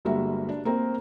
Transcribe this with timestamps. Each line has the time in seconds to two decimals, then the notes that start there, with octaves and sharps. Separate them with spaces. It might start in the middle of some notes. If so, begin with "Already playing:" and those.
0.05 G1 G3 G#3 A#3 F#4 E5
0.49 D4
0.65 A#3 C4 A#4